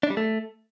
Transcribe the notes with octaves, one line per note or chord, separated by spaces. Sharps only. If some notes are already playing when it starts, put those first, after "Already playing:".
D4
G3
A3